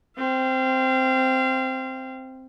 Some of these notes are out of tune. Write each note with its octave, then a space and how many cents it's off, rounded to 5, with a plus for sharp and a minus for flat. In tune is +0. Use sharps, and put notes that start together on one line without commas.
C4 +0 F5 -30